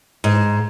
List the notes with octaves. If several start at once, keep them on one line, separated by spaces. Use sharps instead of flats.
G#2